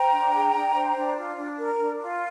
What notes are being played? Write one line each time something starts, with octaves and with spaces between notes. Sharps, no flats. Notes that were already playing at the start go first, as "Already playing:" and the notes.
Already playing: C5 G5 A#5
D4
G#4
D4
C5
D4
F4
D4
A#4
D4
F4